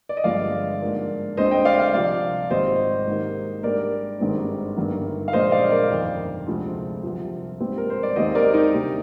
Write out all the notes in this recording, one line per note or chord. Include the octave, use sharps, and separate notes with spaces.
D5
D#5
G1 G2 F3 G#3 D4 D5 F5
G#2 F3 A#3 D4
D2 D3 G#3 C4 C5 D#5
D#5 G5
D5 F5
D5 F5
C2 C3 F3 D5 F5
G#1 G#2 G3 C4 C5 D#5
G#2 D#3 A#3
G#2 G3 D4 A#4 D5
G#1 G2 D#3 G#3 C4
G1 G2 D#3 A#3
F5
A#1 A#2 G#3 D4 C5 D#5
D5 F5
A#4 D5
G1 F2 D#3
D2 C3 F3 G#3 D4
C2 C3 F3
G#2 G3 C4
A#4
C5
D5
D#2 D#3 G#3 C4 C5 D#5
A#4 D5
D#4
D2 C3 G3